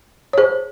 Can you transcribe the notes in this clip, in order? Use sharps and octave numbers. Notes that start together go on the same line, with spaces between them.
C#5
G#4 C5